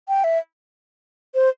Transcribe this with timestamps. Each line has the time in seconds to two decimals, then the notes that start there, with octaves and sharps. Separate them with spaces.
0.08 G5
0.24 E5
1.35 C5